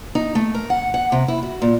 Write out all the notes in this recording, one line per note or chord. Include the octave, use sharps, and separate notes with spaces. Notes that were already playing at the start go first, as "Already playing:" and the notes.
D#4
A3
A#4
F#5
F#5
C3
E4
F#4
A#2